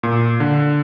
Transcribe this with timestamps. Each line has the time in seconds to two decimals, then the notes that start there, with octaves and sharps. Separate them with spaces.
0.03 A#2
0.40 D3